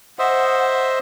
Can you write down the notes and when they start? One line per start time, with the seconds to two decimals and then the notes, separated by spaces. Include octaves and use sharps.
0.19 C5 D#5 E5 F#5